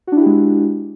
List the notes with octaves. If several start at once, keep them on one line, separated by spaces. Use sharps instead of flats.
G#3 D4 E4 F#4 G4